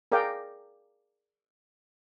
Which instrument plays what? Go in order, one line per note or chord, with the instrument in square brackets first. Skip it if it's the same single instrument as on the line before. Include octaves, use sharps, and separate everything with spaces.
[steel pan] G#4 A#4 D5 F5 G5